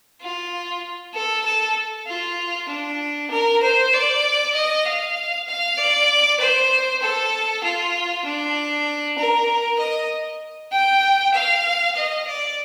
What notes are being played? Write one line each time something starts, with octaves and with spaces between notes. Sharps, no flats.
F4
A4
A4
F4
D4
A#4
C5
D5
D#5
F5
F5
D5
C5
A4
F4
D4
A#4
D#5
G5
F5
D#5
D5